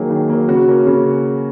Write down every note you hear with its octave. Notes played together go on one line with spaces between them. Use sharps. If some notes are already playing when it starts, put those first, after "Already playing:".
Already playing: D#3 F#3 A#3 G#4
D#3
F#3 A#3
C#3 F#4
A#3 C#4
C#3